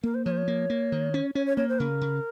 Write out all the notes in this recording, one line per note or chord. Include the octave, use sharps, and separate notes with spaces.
A#3 A#4
C5
F3 C#5
C5
C#5
A#3
A#3
D#3
C#4
C#4 C#5
C#5
A#3 C#5
C5
C#3 A#4
C#3